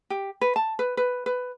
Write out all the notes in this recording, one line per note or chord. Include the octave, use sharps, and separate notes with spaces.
G4
B4
A5
B4
B4
B4